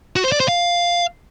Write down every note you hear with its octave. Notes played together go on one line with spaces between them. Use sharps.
F#4
C5
D5
C5
F5